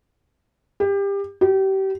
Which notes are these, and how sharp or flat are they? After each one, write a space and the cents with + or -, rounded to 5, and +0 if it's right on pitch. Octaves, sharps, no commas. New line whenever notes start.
G4 +25
G4 -30